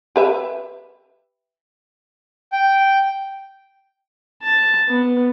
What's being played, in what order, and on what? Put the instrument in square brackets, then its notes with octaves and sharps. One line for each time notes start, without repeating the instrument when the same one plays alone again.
[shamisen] G4 B4 E5
[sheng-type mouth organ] G5
[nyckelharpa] A5
B3